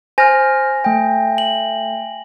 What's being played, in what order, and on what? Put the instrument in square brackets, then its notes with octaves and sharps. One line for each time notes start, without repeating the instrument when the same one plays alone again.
[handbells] C5 F6 [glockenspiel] G#5 A#6
[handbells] A3 G5
[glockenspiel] F#7